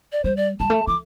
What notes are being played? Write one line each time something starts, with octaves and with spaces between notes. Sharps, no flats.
D5
G3 C5
D5
G3 A5
A3
E3 D6